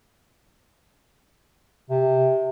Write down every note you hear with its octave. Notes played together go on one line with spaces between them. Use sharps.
C3